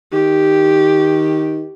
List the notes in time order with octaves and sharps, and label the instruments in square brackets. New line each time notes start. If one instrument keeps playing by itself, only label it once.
[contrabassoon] D#3 [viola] G4